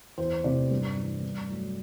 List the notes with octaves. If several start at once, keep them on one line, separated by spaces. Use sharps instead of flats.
E2 C5
C3 E3 A3 D5
G2
E3 G3
G2
F#3 A3